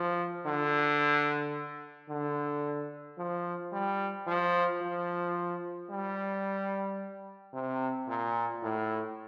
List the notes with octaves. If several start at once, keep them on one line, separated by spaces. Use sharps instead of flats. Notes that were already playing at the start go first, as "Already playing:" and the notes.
Already playing: F3
D3
D3
F3
G3
F3
F3
G3
C3
A#2
A2